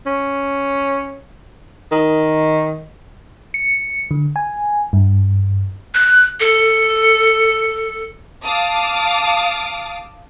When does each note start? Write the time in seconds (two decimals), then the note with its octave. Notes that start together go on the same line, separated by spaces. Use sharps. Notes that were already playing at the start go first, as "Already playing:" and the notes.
0.06 C#4
1.92 D#3
3.54 C#7
4.11 D3
4.36 G#5
4.93 G2
5.94 F#6
6.40 A4
8.45 F5 A5 D6 D#6